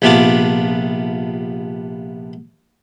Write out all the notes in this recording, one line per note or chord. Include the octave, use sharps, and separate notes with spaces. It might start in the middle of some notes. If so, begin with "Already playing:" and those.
A#1 C3 B3 D4 F4 D6